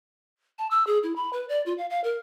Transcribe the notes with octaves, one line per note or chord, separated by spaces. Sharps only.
A5
E6
G#4
E4
B5
B4
D5
F4
F5
F5
A#4